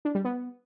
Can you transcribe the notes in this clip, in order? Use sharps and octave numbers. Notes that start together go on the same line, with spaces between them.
D4
G3
B3